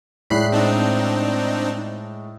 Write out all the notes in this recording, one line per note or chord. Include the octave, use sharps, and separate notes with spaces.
A2 G#3 D5 B5 F#6 C7
C4 D4 D#4